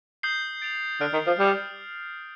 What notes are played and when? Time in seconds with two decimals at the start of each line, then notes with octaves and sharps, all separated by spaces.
0.23 D#6 G6 C7 G7
0.62 A6 D7 F7
1.00 D3 F6 A6 D7
1.13 D#3
1.27 F3
1.39 G3 D#6 G6 D7 F7